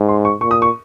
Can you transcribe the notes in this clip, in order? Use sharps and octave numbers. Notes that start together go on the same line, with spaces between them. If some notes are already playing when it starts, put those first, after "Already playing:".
Already playing: G#2
C6
C#6
A#2 C#6
D#6
C#6